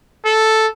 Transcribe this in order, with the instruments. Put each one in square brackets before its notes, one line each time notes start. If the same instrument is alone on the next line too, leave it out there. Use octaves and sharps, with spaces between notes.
[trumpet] A4